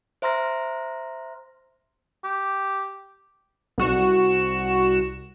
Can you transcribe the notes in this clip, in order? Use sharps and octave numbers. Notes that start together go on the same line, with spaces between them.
C5 E5 A#5 C6 F6 A#6
G4
C2 F#4 E7